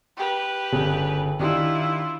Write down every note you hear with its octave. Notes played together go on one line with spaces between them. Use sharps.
G4 B4
G1 C#3 G3
D#3 D4 E4 F4 G4